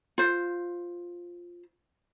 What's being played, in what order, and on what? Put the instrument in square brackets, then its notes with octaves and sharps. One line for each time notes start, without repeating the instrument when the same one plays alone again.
[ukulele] F4 C5